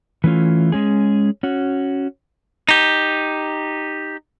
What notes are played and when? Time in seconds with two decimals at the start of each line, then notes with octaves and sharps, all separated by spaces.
0.24 E3 A3 C#4 F4
0.72 G#3 C#4 G#4
1.43 C#4 F#4
2.69 D#4 G4